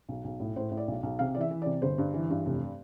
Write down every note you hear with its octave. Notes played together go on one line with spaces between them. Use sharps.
B1
B1
A2
A2 C5
A2
D5
B1
B1
C3 F5
E3 D5
E5
E3
C3 D5
G1 C5
G2
E3
G2
F1